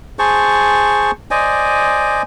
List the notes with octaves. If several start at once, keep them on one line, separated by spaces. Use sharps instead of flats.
G#4 C5 A5 C#6
C5 D5 D#5 G#5